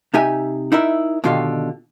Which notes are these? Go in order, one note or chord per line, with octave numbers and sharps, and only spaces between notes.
C3 D#4 G4 E5 G#5
D#4 E4 A#4 E5
B2 D3 D#3 F4 G4 F5